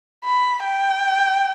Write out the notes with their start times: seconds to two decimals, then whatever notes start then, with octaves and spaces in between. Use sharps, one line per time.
0.25 B5
0.64 G5